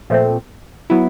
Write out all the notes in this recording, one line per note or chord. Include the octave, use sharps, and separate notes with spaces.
A#2 F3 A3 C4
F#3 B3 E4